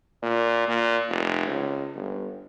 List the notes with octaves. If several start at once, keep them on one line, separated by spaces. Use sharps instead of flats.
A#2
A#2
F1
C#2
G1